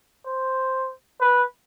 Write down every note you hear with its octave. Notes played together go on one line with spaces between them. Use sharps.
C5
B4